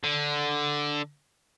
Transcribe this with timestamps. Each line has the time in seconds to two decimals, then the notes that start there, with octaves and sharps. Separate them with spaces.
0.04 D3